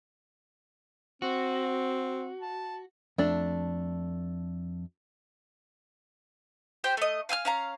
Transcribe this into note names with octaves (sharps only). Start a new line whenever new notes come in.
C4 F#4
A5
F2 A3 D4
G4 C5 G5
A3 D#5
F5 G#5 E6 F6
C#4 F5 A#5